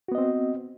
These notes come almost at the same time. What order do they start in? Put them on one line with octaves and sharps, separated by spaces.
F#4 B3 D#5 C4